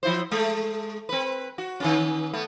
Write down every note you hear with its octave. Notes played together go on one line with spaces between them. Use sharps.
F3 E4 C5
G#3 A3
C4 B4
F#4
D#3 B3 C#4
A3 B3